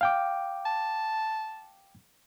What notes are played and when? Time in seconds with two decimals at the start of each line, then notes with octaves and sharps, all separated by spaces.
0.01 F5 G5 D6
0.66 A5